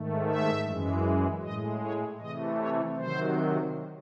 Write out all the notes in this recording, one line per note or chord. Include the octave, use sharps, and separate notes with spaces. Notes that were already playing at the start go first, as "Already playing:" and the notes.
Already playing: G#2 D#3 A3
E5
F#2 E3 G#3
A2 G#3 D#5
C#5
C3 E3 A3 D#5
C#5
C3 D#3 F#3 C5